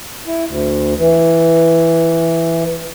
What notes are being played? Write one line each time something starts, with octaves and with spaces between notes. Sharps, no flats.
E4
D2
E3